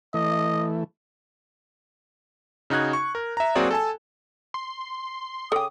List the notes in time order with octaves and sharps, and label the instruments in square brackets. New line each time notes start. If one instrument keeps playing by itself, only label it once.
[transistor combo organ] E3 A3 [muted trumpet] D#5
[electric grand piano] C#3 D#4 F#4 F#6 G#6
C#6
A#4
E5 A#5
F#3 A#3 C4 F#4 G#4 D5
A4 G#5 A5
[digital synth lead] C6
[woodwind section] C#3 D6 D#6 [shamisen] A4 G5